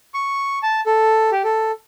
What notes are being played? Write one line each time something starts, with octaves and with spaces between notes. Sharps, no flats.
C#6
A5
A4
G4
A4